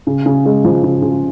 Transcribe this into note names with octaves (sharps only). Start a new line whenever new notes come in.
C#3
C#3
G#3
F3
C#3
C#3